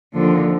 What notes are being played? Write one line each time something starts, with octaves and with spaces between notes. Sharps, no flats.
D#2 D3 F3